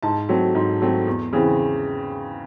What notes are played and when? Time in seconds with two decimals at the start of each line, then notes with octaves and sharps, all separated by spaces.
0.03 G#2 A5
0.29 F#3 A3 C4
0.55 G#2
0.81 F#3 A3 C4
1.07 E2
1.33 C#3 E3 C4